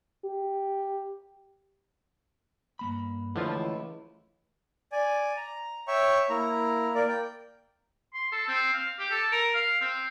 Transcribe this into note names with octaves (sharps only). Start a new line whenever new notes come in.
G4
G2 A#3 B5
C#2 D3 E3 F3 A3 C#4 E4 F4
D5 G#5
A#5
C#5 E5 G5 C#6
A#3 E4 A#5
A#3 A#4 D5
G5
C6
A4
C4
F5
G4
A4
A#4
F5
C4